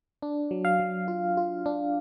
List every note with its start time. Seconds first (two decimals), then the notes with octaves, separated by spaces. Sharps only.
0.22 D4
0.51 F#3
0.65 F5
0.79 F#3
1.08 F4
1.37 F4
1.66 D4